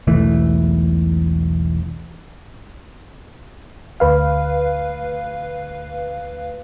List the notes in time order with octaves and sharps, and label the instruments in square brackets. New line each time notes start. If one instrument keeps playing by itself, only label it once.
[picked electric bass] E1 B1 E3 A3
[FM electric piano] D2 B4 F5